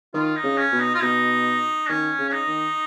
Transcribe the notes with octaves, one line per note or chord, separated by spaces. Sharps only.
D#3 F4
D#4
C#3
C#4
B2
D#4
F4
B2 D#4
D#3 C#4
C#3
C#4
D#4
D#3